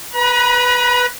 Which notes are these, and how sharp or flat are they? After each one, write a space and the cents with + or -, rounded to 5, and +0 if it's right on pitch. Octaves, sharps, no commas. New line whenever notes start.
B4 +0 A#5 +45